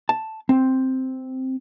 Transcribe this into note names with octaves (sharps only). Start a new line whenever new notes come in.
A5
C4